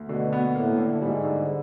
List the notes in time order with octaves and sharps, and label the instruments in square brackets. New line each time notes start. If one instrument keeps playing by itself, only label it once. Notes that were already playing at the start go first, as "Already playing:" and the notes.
Already playing: [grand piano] D2
[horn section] B2 [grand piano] D3
[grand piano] B3
[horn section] A2 [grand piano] A#3
[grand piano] D3
[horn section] G#2 [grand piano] G3
[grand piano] D3